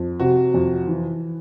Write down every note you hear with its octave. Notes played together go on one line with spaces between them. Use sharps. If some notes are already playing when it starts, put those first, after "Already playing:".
Already playing: F2
C3 F#4
F2
E3